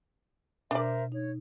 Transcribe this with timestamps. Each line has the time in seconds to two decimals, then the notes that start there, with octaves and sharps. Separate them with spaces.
0.71 B2 D4 A#4 C5 D5 E5
1.12 D#4 C#5